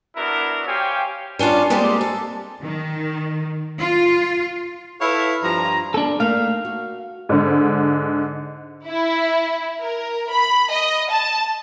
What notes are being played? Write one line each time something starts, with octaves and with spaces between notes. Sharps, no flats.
B3 D4 E4 F#4 A#4
G4 C5 C#5 F5 G5 G#5
G3 C#4 D4 F4
G3 G#3 A#3 C4 G4
A4
D#3
F4
E4 A4 B4 C#5 E5 F5
G2 F3 A#5
D4 A4
A3 A#3 D#4 F5
F#4
G#2 D3
E4
A#4
B5
D#5
A5